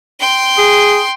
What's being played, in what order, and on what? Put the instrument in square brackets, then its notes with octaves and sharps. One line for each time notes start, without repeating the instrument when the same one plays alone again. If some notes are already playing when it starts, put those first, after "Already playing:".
[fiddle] G5 C6
[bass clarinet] G#4